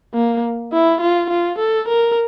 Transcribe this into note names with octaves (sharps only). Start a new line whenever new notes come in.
A#3
E4
F4
F4
A4
A#4